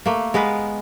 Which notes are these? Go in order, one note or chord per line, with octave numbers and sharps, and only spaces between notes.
A3 A#3
G#3 B3 A#4 B4